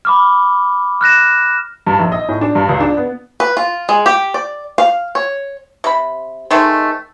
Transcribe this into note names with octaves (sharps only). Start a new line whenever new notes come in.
B5 D6 F6
F6 F#6 A#6 E7
G2
A#1
D#5
A2
D4
G2
C#2
D4
B3
B4
F4
G#3
G4
D5
F5
C#5
C3 B5
D#3 G#3 A3 C4